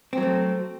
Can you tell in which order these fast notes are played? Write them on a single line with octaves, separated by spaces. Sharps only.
C4 F#3 A3